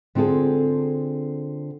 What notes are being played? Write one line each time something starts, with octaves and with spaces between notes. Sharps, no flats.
D3 C4 F4 G#4 A4